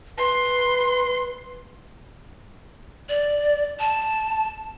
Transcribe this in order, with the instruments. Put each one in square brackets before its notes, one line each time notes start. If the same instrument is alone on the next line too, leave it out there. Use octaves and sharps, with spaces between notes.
[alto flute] B4 [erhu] C6
[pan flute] D5
A5